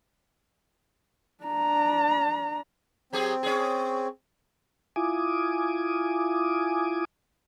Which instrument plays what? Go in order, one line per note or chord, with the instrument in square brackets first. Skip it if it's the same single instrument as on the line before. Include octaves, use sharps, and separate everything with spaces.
[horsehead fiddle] D4 A#5
[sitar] F#3 G4 G#4 [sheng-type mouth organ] C4
[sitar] C#4 G#4
[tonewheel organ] E4 F4 G#5 D6 D#6